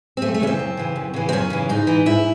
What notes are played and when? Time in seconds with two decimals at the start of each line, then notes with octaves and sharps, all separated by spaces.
0.17 C4
0.22 F#2 A3
0.34 A3
0.40 C#3 E3 C#4
0.47 C4
0.59 F#2
0.77 C#3 E3
0.96 F#2
1.14 C#3 E3
1.29 C4
1.32 F#2 C#4
1.50 C#3 E3
1.69 G#2 D#4
1.87 E3
2.06 G#2 E4